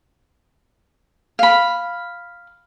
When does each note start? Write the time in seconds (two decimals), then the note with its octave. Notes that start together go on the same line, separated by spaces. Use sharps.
1.39 F5 B5